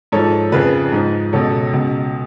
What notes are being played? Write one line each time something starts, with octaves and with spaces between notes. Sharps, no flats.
G#2 F3 A4 C#5
F2 C#3 F3 G#4 B4
G#2 F3
C#2 B2 A4 C#5
C#2 B2